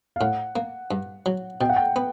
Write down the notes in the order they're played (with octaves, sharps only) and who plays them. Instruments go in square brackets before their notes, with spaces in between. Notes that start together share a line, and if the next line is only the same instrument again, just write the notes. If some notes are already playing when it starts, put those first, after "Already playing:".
[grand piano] F5
[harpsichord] A2 [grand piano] F#5
[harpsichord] A#3
G2
F#3
[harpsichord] B2 [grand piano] G5
[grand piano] F#5
G5
[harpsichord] B3